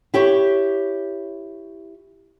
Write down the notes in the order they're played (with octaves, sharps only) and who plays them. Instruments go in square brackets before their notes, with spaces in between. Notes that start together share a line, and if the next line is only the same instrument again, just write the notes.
[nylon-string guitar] E4 G4 C#5